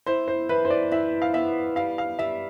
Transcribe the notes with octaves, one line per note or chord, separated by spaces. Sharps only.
E4 C5
C5
E3 B4
C5
D5
E4 E5
F5
B3 E5
G3 F5
F5
G3 E5